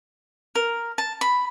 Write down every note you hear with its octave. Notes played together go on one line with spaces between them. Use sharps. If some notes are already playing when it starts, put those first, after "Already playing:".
A#4
A5
B5